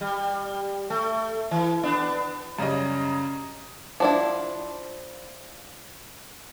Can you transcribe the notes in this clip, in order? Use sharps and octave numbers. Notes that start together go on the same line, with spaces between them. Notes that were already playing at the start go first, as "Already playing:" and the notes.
G3
A3
E3
B3 D4
F#2 C#3 G3 C#4 D#5 A#5
F3 D4 E4